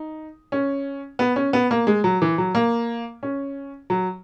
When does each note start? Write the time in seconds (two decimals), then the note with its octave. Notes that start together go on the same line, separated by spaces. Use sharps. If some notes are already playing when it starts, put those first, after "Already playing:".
Already playing: D#4
0.52 C#4
1.19 B3
1.36 C#4
1.53 B3
1.71 A#3
1.87 G#3
2.04 F#3
2.22 E3
2.38 F#3
2.55 A#3
3.23 C#4
3.90 F#3